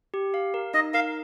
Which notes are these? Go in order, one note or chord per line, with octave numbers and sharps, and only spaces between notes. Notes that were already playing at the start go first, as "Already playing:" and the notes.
G4
F5
A#4
D#4 D#5
A#4 F5